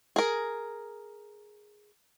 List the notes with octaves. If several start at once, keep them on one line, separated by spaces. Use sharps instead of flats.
G#4 A#4